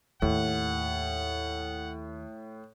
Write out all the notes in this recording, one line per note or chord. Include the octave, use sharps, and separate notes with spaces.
D#2 A2 F#5